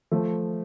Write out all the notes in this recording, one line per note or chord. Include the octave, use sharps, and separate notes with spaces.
F3 A3